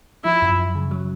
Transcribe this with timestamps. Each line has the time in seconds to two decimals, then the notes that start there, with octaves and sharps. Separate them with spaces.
0.24 F3 E4
0.42 F#2
0.58 F#2
0.75 C#3
0.91 F#3